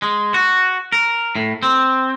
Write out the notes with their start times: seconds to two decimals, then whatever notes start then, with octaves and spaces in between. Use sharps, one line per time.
0.02 G#3
0.34 F#4
0.92 A#4
1.35 A2
1.63 C4